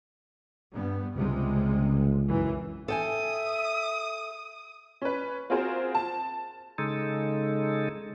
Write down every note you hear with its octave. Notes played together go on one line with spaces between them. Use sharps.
G2 B3
C#2 C3 G3 G#3
B1 F#2 E3
A4 E5 G5 G#5 D#6
C#4 B4
C4 F4 F#4 G#4 A#4 C5
A5
C#3 G#3 D#4 A4